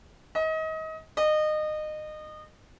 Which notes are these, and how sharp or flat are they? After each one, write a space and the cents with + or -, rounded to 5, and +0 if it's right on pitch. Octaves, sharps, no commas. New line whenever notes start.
D#5 +30
D#5 -25